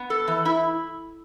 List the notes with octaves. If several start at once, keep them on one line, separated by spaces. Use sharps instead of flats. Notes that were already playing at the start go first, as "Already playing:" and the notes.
Already playing: B3
A4
E3
E4